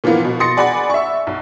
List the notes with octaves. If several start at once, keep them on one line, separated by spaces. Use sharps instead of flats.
A#2 E3 F3 A#3 B3
B2
C6 D#6 A6 A#6 C#7
G#4 D5 F#5 G#5 B5
E5 C#6
B1